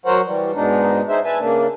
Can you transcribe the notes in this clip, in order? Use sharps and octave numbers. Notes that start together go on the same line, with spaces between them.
F#3 A#4 C5 C#5 F#5
E3 G3
G#2 B2 G#3 D4 D#4
D#4 G#4 C5 E5
B4 E5 G#5 A5
C#3 A#3 D4